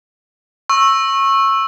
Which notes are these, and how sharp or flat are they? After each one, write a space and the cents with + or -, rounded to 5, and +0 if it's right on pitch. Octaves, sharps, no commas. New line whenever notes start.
C#6 -20 E6 +0